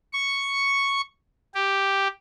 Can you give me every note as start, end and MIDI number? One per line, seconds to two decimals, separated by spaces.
0.13 1.01 85
1.55 2.08 67